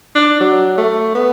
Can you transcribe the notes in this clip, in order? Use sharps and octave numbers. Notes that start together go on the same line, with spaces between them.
D4
F#3
A3
B3